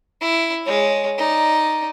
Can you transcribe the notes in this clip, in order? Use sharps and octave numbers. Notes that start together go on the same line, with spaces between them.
E4
G#3 C#5
D#4 D5